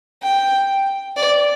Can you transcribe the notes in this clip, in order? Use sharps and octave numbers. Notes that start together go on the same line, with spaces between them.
G5
D5